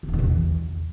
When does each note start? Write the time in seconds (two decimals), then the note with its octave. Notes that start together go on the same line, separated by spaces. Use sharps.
0.03 C3
0.08 E3
0.13 D#3
0.19 C3
0.24 E2